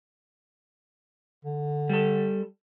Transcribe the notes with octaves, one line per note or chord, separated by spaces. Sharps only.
D3
G3 A4